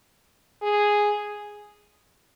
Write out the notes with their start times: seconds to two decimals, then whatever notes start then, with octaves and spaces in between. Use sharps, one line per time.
0.62 G#4